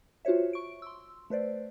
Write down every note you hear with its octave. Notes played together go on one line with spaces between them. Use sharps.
F4 F#4 C5 C#5 E5
C#6 D7
C6 E6
A3 B4 C5 D5